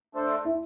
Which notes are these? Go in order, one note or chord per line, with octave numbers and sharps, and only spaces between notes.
A3 D4 A4 C5
E4